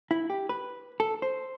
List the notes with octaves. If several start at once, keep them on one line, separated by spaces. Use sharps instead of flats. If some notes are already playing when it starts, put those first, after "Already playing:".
E4
G4
B4
A4
C5